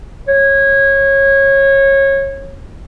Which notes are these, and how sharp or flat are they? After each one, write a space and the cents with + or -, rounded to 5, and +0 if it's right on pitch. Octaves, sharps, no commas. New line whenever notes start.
C#5 -20